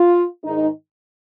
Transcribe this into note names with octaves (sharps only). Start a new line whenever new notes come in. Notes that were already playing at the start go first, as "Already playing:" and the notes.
Already playing: F4
G#2 D#3 G#3 D#4